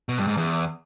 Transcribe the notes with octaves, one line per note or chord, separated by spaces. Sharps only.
B2
G2
G#2
E2